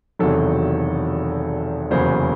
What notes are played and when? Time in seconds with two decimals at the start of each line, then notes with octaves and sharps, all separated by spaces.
0.19 E1 E2 C3 D#3 F#3 A4
1.90 F1 E2 C#3 F#3 A#3 C5